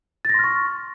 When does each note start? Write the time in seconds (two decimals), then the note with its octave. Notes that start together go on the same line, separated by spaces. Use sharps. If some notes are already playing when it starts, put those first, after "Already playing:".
0.25 A6
0.29 A#6
0.34 C6
0.39 F6
0.44 C#6